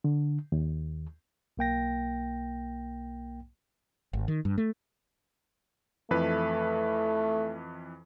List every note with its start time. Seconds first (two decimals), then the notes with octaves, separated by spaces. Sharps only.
0.04 D3
0.52 D#2
1.57 B1 A#3 G5 A#6
4.13 G#1
4.28 D#3
4.45 G2
4.58 A3
6.11 F2 E3 A3 B4